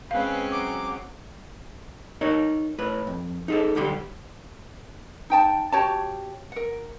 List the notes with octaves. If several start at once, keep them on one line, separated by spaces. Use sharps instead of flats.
G#3 C4 C#4 B4 F5
F#3 D6
D#4 A#4 C#5
A2 B4
F2
D#4 G#4 A4
B1 D3 G3 G4 C6
D#4 G5 A5
F#4 G4 C#5 A5
A#4 F#5